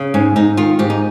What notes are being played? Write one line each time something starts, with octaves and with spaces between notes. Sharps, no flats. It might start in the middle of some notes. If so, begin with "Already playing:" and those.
Already playing: C#3
G#2 C#4
G#2 D#4
D#3 F4
G#2 G4
D#4